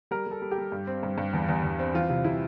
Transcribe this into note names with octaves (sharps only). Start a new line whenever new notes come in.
G3 A#4
G3 A4
G3
G4
G3
G2
C4
G2
G2
E2
E2
E2
C4
E3 F4
C3 F4
C3 E4